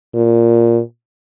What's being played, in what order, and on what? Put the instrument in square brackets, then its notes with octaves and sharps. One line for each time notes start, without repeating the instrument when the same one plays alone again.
[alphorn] A#2